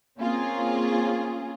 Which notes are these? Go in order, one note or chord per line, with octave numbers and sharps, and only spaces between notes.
A#3 C4 C#4 F4 G#4